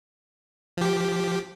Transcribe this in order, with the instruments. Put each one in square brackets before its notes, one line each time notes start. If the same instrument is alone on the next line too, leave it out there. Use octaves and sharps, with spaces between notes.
[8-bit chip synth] F3 G4